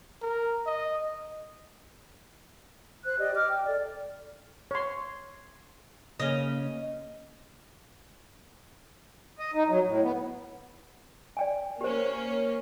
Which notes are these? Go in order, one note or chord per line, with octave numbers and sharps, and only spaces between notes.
A#4
D#5
C5 F#6
G4 D5 D#5
D#5 D6 F6
G5
A4 D5
C#5 C6
C#3 A#3 C#4 D#5
D#5
D#4
F#3
A2
B3
D5 G5 G#5
A#3 C#4 G4 C5